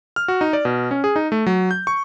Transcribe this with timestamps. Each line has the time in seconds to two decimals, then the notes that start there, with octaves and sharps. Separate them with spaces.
0.16 F6
0.28 F#4
0.41 D#4
0.53 D5
0.65 B2
0.91 C#4
1.04 G#4
1.16 D#4
1.32 A3
1.46 F#3
1.71 G6
1.87 C#6